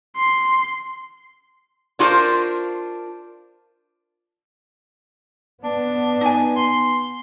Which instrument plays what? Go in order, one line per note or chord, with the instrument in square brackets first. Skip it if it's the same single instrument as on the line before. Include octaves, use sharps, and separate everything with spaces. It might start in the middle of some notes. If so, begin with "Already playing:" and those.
[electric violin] C6
[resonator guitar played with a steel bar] D4 F4 F#4 A4 A#4 C5
[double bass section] B3 [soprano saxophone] D4
[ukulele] D#4 G#5
[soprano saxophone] C6